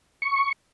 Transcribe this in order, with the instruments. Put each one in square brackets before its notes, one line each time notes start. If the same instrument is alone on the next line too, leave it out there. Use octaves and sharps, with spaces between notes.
[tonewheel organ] C#6